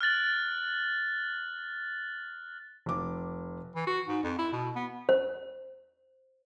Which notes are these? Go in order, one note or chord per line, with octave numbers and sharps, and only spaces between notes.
F6 F#6 A6 F#7
F1 D6
E3
F#4
G#2
F2
E4
B2
B3
C5